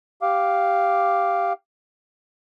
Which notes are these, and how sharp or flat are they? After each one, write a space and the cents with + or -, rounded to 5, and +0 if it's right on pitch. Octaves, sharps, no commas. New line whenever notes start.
G4 +0 F5 +0 D6 +0